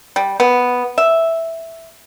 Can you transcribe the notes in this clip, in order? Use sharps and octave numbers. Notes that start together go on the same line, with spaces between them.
G3
B3
E5